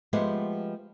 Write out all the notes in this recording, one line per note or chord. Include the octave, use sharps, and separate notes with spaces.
F3 G#3 A3 B3 G4